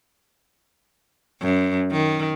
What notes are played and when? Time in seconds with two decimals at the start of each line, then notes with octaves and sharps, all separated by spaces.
1.42 F#2
1.92 D#3